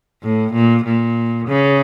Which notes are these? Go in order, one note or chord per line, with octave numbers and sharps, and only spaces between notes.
A2
A#2
A#2
C#3